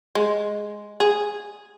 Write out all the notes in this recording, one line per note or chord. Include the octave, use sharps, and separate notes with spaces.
G#3
G#4